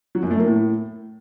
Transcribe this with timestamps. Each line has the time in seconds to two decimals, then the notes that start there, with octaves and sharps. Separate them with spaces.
0.15 F#3
0.23 F#2
0.31 A3
0.39 A#3
0.46 A2